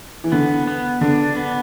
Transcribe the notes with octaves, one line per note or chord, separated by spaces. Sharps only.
E3
D3 B3
B3
D3 D4
B3